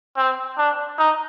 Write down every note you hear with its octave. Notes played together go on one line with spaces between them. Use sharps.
C4
D4
D#4